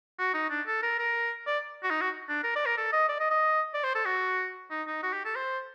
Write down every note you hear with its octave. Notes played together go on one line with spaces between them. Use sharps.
F#4
D#4
D4
A4
A#4
A#4
D5
F#4
D#4
F#4
D4
A#4
D5
A#4
A4
D#5
D5
D#5
D#5
D5
C5
A4
F#4
D#4
D#4
F#4
G4
A4
C5